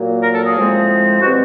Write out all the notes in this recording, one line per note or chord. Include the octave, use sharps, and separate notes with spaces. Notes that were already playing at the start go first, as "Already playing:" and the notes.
Already playing: A#2 F#3 A#3
A#4
A4
G#4
A2 F3 G#3 C4
B2 G3 C4 F#4